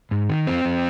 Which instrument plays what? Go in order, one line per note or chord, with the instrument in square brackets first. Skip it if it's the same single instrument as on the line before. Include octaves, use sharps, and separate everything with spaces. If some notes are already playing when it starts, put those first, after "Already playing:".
[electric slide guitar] G#2
D#3
F2 C4
F2